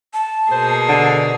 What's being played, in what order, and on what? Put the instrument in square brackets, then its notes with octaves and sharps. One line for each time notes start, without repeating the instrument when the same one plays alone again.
[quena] A5
[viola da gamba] B2 A#3 G#4 [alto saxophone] C5
[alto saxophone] D3